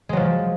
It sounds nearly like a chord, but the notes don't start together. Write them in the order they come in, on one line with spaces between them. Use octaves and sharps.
G#3 F#3 F3